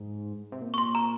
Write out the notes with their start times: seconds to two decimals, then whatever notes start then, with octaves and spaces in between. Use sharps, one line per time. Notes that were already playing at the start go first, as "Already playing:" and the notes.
Already playing: G#2
0.52 C3
0.62 A#2
0.74 C#6
0.78 C6
0.95 A#5